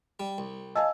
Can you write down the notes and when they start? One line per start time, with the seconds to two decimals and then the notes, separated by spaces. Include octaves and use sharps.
0.20 G3
0.38 C2
0.75 D#5 F5 G#5 A5 E6